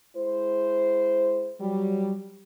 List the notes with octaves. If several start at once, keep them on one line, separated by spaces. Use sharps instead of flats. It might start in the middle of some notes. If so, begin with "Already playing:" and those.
G#3 E4 C5
F#3 G3